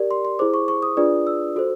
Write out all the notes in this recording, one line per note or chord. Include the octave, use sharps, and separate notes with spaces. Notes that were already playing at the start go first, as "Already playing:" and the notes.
Already playing: G4 A#4 D5
C6
C6
E4 G#4 C5 D6
C#6
C#6
D#6
D4 F4 G#4 B4 D5
E6
F#4 A4 C5